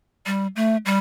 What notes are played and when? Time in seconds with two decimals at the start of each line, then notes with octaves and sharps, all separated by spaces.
0.26 G3
0.56 A3
0.85 G3